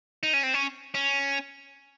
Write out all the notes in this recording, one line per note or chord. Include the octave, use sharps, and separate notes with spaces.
D#4
C#4
C4
C#4
C#4